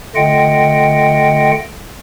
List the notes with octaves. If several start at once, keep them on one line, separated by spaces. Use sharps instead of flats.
D3 A3 F4 D#5 F#5 G5